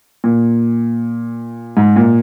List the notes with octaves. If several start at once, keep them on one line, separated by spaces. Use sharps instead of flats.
A#2
G#2
A#2